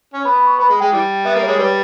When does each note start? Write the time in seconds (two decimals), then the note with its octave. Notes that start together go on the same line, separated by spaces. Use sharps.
0.14 C#4
0.25 B3 B5
0.36 B5
0.47 C#6
0.59 B3 B5
0.69 G#3
0.80 G#3 G5
0.92 E3 G3
1.25 B3 E5
1.36 A#3
1.43 G#3 C#5
1.59 G3 B4